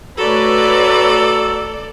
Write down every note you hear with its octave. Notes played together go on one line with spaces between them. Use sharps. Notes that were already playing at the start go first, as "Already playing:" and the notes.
A3 F#4 A4 B4 C#5 D5 A#5 E6